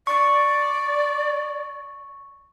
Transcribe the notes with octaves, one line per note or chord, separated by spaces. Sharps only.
D5 C#6